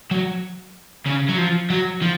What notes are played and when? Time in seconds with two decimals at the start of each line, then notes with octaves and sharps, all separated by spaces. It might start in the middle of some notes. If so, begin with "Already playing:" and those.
0.11 F#3
1.06 C#3
1.29 F#3
1.38 F3
1.70 F#3
2.02 F3